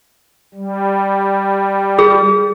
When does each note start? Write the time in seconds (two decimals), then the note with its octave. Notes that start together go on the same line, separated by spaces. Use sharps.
0.55 G3
1.99 G#4